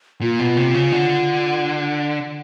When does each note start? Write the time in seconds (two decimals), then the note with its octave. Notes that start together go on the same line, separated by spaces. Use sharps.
0.21 A#2 F4
0.39 B2
0.57 C3
0.74 C#3
0.92 D3